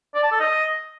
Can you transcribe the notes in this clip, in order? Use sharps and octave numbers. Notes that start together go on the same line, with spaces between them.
D5
A5
A4
D#5